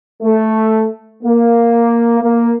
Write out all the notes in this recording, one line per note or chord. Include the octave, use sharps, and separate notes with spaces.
A3
A#3
A#3